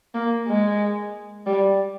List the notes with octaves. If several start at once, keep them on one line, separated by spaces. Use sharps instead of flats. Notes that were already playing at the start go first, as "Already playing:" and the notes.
A#3
G#3
G3